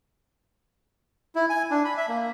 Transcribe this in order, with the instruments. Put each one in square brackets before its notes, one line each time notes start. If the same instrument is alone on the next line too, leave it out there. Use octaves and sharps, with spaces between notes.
[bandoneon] E4
G#5
D4
B5
E5
A#3